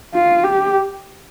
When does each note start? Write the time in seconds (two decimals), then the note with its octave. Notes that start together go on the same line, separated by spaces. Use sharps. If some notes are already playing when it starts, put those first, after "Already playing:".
0.14 F4
0.44 G4